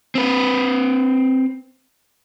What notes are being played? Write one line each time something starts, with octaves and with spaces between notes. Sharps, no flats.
C4 B4